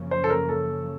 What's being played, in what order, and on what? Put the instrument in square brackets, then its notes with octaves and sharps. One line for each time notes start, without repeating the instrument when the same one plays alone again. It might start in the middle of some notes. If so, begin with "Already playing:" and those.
Already playing: [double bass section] F#2 C#3 F3 A#3 C#4
[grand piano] C5
A4
A#4
A4